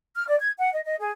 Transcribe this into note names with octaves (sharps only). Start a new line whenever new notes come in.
F6
D5
G#6
F#5
D#5
D#5
G#4